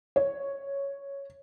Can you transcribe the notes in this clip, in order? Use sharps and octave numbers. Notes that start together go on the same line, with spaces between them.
C#5